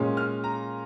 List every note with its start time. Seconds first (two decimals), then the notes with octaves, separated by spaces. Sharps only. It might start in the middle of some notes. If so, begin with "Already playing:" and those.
Already playing: A#2 G#3 C#4
0.17 F6
0.44 A#5